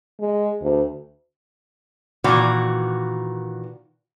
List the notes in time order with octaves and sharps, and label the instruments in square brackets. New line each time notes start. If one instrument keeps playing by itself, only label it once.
[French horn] G#3
D2
[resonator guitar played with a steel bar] A#2 D#3 E3 F#4